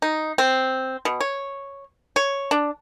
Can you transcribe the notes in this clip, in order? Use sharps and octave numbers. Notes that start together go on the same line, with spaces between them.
D#4
C4
B2
C#5
C#5
D4